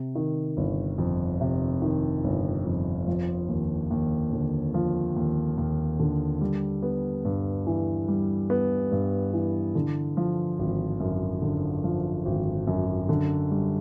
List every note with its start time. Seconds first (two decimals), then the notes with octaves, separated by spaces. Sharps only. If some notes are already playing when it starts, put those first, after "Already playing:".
Already playing: C3
0.15 D#3
0.57 G1
0.98 F2
1.41 C3
1.82 D#3
2.24 G1
2.66 F2
3.07 F3
3.49 D#2
3.91 D#2
4.33 D3
4.74 F3
5.16 D#2
5.58 D#2
5.99 D3
6.41 G3
6.83 B3
7.25 G2
7.67 E3
8.08 G3
8.50 B3
8.92 G2
9.33 E3
9.75 D3
10.17 F3
10.59 G#1
11.00 F#2
11.42 D3
11.84 F3
12.25 G#1
12.67 F#2
13.09 D3
13.51 G3